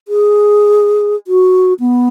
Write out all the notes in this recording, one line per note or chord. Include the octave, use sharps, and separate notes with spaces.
G#4
F#4
B3